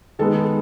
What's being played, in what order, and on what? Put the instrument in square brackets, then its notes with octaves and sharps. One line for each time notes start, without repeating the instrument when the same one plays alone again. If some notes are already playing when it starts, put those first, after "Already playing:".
[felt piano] D#3 G#3 B3 A4